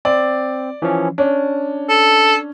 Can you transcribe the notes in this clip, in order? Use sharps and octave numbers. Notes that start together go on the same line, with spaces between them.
C4 D5
E3 F3 C#4
C#4 D4
A4